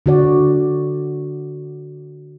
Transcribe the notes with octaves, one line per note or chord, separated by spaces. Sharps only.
D3 F#4 D5